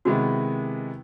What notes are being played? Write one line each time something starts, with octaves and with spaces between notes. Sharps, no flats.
C3 D#3 G#3 B3 E4 F#4